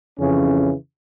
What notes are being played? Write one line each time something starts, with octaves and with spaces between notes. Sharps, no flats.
F2 C#3 E3 C#4